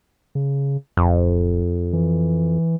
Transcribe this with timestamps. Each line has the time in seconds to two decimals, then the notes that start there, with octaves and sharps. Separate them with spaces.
0.35 C#3
0.97 D1 F2
1.93 E3